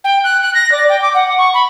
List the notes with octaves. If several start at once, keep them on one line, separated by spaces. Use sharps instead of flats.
G5
F#6
F#6
A#6
D5
G5
D6
F#5
C#6
B5